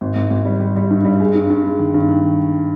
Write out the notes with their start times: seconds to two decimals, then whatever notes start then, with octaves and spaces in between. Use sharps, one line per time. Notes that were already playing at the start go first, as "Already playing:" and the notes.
0.01 G#1
0.16 G#1
0.30 G#1
0.45 G3
0.60 G3
0.76 G3
0.91 G2
1.05 G3
1.20 G#3
1.35 G2
1.50 G2
1.65 G#3
1.79 D#3
1.94 G2
2.09 D#3